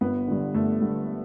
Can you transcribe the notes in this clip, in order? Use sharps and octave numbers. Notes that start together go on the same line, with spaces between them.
G1 B3
G2 D3
G1 A3
G2 D3